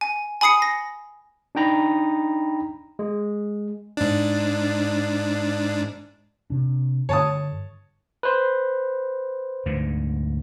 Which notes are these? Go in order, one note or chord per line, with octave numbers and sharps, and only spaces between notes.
G#5
G#5 B5 D#6 C7 C#7
A#6
D4 D#4 G5 A#5 B5
G#3
G#2 D4
C3 D4
G2 D3 C#5 A5 D#6
B4 C5
D2 G#2 D3